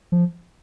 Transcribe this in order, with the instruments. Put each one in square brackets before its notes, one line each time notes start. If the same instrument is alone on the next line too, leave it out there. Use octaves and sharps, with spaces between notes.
[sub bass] F3